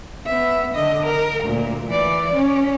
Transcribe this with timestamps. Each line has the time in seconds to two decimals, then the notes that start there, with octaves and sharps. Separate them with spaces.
0.27 B3 E5
0.74 D3 D#5
1.06 A#4
1.44 D2 A#2
1.87 E3 D5
2.34 C#4